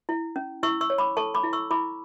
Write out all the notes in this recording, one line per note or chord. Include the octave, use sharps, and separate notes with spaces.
E4
C#4
E4 C#6 E6
C#6 E6
C#5
B5 D6
A4 A5 C#6
B5 D6
E4
C#6 E6
E4 B5 D6